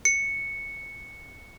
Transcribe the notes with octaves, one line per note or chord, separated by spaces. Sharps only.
C#7